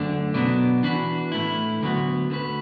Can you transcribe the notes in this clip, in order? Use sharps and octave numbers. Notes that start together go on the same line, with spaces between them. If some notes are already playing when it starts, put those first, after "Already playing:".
Already playing: F#2 D3 A3 D4
B2 F#3 B3 D4
E3 D4 F#4 B4
A2 A3 E4
D2 D3 F#3 B3 F#4
D3 A3 F#4 B4